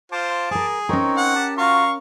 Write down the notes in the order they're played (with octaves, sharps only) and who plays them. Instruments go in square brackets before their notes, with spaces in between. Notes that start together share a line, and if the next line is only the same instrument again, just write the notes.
[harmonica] F4 C5 [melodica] A5 D6
[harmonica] G#4 [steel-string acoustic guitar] A#4 C5
[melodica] C4 D#4 C#5 [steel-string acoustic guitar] C#4 A#4
[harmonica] F#5
[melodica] G4 A5
[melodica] F4 F#4 [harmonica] F5 A#5 C#6